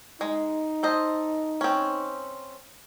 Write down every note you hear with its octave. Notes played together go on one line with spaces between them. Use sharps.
G#3 D#4
A4 C5 D#5
C4 C#4